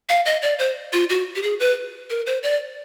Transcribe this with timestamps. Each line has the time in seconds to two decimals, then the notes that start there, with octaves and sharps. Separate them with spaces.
0.09 F5
0.26 D#5
0.42 D5
0.59 C5
0.93 F4
1.09 F#4
1.35 G4
1.43 G#4
1.60 B4
2.10 A#4
2.26 C5
2.43 D5